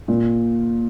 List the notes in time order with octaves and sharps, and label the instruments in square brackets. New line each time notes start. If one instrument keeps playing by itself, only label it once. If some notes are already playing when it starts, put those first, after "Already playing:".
[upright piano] A#2